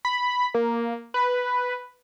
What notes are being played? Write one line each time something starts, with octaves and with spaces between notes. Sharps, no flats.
B5
A#3
B4